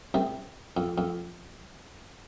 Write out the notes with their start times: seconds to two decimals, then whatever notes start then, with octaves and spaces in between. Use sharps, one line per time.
0.14 C2 C3
0.77 F2
0.98 F2